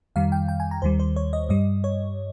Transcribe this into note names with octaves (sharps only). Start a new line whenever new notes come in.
F2 D#3 G3 F5
G5
G5
G#5
A#5
D#2 D#3 G3 C5
C5
C#5
D#5
G2 G3 D#5
C#5